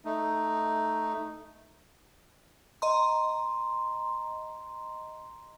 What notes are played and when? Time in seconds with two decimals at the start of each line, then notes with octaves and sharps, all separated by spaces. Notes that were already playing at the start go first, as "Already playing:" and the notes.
0.05 A3 D#4
2.82 D#5 A#5 C6